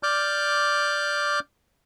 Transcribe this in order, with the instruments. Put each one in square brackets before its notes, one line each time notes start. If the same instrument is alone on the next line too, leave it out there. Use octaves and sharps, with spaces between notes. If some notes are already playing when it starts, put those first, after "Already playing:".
[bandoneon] D5 D6 F6 G6